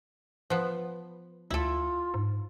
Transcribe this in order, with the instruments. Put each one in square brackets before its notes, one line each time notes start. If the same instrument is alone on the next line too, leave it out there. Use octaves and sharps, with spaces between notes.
[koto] F3 B3
[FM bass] D2 [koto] E4 A4 [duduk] F4
[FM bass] G#2